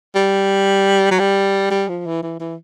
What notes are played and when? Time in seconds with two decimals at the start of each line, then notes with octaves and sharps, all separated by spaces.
0.15 G3
1.11 F#3
1.19 G3
1.71 G3
1.89 F3
2.06 E3
2.23 E3
2.40 E3